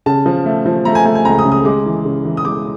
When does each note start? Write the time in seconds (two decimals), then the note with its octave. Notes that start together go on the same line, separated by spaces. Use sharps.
0.06 C#3 A5
0.26 F3
0.46 A3
0.66 F3
0.85 A3 A#5
0.95 G#5
1.05 A3 G#5
1.15 G#5
1.25 C#2 A#5
1.39 D#6
1.45 C#3
1.52 D#6
1.65 G#3 D6
1.86 E3
2.05 C#3
2.25 E3
2.37 D#6
2.45 G#3 D6